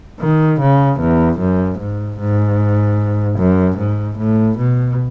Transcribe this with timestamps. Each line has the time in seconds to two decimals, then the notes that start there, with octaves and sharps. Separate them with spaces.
0.20 D#3
0.60 C#3
1.00 E2
1.39 F#2
1.79 G#2
2.19 G#2
3.39 F#2
3.78 G#2
4.18 A2
4.58 B2